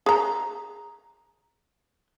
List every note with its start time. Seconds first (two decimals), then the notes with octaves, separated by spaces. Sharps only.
0.06 G#4 A#5